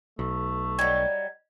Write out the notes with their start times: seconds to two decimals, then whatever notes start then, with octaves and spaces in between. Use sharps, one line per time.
0.19 B1 A3
0.79 F#3 G3 D#5 G#6